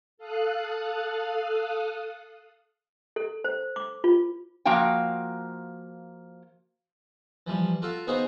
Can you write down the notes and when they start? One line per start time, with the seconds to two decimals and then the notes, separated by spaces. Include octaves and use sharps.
0.18 A4 F5 D#6 F#6
3.16 A4
3.44 C5
3.76 D6
4.04 F4
4.65 F3 A#3 F#4 F5 G5
7.47 E3 F3 G3
7.82 F4 F#4 A4 F5
8.07 B3 D#4 F#4 G#4 C5 F5